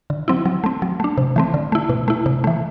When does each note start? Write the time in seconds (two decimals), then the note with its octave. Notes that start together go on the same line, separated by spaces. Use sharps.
0.10 D3
0.28 F#3 C4 E4
0.45 F#3
0.64 A3 C4
0.82 F#3
1.00 A3 D4
1.18 C3
1.36 E3 A3 C4
1.54 D3
1.72 A3 E4
1.89 B2
2.08 A3 E4
2.26 C3
2.44 E3 A3